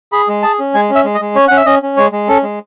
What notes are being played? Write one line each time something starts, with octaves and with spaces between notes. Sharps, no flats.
G#4 B5
G#3
G#4 A5
C#4
G#3 G#5
C#4
E5
G#3
D#5
G#3
C#4 C#5
C#4 F#5
E5
C#4 D#5
C#4
G#3 C#5
G#3
C#4 A4
G#3